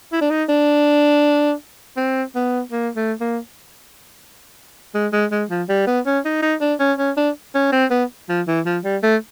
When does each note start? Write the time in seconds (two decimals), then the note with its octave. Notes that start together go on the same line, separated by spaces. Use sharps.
0.13 E4
0.21 D4
0.31 D#4
0.49 D4
1.97 C4
2.35 B3
2.72 A#3
2.96 A3
3.21 A#3
4.95 G#3
5.13 G#3
5.32 G#3
5.50 F3
5.69 G3
5.87 B3
6.06 C#4
6.25 D#4
6.42 D#4
6.61 D4
6.80 C#4
6.99 C#4
7.17 D4
7.55 C#4
7.72 C4
7.91 B3
8.29 F3
8.48 E3
8.66 F3
8.84 G3
9.03 A3